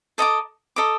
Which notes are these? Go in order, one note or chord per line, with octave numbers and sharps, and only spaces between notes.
A4 D#5 A#5 D6
A4 D#5 A#5 D6